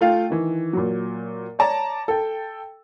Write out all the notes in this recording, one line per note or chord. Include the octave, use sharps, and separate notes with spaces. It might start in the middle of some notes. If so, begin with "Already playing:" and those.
A3 F4 F5 G5
D#3 E3
A#2 F#3
C#5 D5 A5 A#5
A4 G5